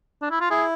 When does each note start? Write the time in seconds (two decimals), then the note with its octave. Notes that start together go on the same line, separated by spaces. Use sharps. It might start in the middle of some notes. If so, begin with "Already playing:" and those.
0.22 D4
0.31 E4
0.41 F4
0.50 E4 G#4